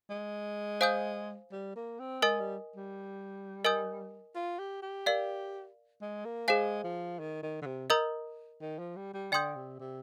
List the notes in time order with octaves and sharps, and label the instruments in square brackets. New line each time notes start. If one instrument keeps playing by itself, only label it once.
[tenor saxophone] G#3
[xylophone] C5 F5 G#5 D#6 G6
[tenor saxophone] G3
A#3
C4
[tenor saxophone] G#3 [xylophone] A#4 D#5 G#5 D#6
[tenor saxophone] G3
G3
[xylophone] A#4 D#5 G#5 D#6 G6
[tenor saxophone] F4
G4
G4
[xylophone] A#4 D5 F5
[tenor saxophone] G#3
A#3
[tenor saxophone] G#3 [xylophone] G#4 C5 F5 G#5
[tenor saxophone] F3
D#3
D#3
D3
C3
[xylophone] A#4 D#5 A#5 D#6 G6
[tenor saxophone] D#3
F3
G3
G3
[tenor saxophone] D3 [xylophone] D5 G5 C6 D#6 G6
[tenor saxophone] C3
C3